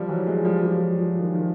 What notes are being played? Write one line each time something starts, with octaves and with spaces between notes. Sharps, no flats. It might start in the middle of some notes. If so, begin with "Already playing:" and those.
Already playing: F3 G3
E3 F#3
F#3 G#3
F3 G3
F3 G3
F3
F#3
D#3 F3
D#3 F3